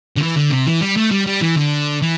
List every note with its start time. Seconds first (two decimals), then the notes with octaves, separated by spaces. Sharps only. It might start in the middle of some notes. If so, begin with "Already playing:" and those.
0.16 D3
0.21 E3
0.36 D3
0.51 C3
0.66 E3
0.81 G3
0.97 A3
1.11 G3
1.27 G3
1.42 E3
1.57 D3
2.02 E3